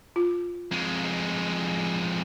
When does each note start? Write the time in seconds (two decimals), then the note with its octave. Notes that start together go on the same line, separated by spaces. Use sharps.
0.16 F4
0.71 F2 G#3